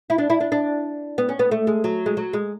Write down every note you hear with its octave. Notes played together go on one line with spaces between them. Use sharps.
E4
D4
E4
D4
D4
B3
C#4
B3
A3
G#3
F#3
G#3
F#3
G#3